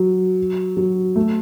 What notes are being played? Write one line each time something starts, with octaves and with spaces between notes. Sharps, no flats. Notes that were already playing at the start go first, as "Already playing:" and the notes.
Already playing: F#3
F#3
A3